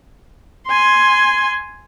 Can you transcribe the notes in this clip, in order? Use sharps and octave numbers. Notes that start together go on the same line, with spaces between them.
G#5 C6